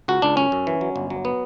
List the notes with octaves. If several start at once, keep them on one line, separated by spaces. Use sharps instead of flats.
C#2 F#4
C#2 D4
F#2 C#4
F#2
E3
F#3
G1
F#3
B3